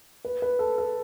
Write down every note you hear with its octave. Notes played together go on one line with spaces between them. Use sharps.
B4
B4
A4
A4